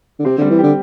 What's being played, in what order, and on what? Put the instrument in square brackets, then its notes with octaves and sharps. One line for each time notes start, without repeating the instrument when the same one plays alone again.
[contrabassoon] D3
[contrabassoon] C3 [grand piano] C4
[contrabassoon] D3 [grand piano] G3
[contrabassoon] E3
[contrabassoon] D3 [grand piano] G4